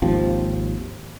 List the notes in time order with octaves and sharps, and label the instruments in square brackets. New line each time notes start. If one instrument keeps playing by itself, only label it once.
[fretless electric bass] G#1 D#2 F3 C4